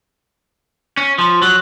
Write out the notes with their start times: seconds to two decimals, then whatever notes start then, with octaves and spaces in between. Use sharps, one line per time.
0.97 C#4
1.18 F3
1.42 F#3